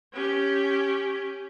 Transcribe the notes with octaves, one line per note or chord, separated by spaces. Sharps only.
C#4 G4